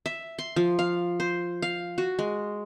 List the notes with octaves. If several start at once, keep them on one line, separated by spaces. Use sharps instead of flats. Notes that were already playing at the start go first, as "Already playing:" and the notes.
E5
C6
F3
F5
C5
F5
F#4
G#3